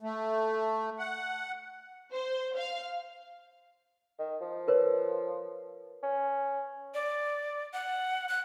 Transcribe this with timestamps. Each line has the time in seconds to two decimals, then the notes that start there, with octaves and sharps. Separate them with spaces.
0.01 A3
0.99 F#5
2.12 C5
2.56 F5
4.19 D#3
4.41 F3
4.68 A#4 B4 C#5
6.03 C#4
6.94 D5
7.74 F#5
8.29 F#6